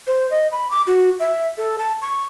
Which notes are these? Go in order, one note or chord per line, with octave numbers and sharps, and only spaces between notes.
C5
D#5
B5
D6
F#4
E5
A4
A5
C#6